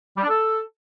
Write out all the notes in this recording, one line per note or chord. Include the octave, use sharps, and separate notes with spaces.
G3
D4
A4